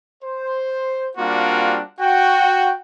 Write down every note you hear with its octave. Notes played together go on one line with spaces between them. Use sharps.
C5
G3 A#3 C4 D4 F4 F#4
F#4 G5